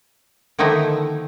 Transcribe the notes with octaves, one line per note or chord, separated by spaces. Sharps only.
D3 D#3 F3 A#3 D#4 E4